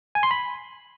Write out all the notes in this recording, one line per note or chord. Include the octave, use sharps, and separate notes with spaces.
G#5
C6
B5